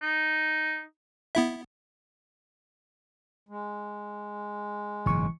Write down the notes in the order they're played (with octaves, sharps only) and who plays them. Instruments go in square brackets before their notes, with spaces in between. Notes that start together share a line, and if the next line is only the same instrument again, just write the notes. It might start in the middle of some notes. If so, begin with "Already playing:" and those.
[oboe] D#4
[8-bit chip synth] B3 E4 E5
[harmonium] G#3
[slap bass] F#1 G#2 B2 [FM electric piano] E3 C#6